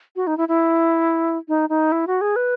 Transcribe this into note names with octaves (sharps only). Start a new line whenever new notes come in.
F#4
D#4
E4
E4
D#4
D#4
E4
F#4
G#4
B4